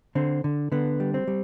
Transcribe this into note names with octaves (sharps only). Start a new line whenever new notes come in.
D3 C4
D3
D3 B3
G3
C4
G3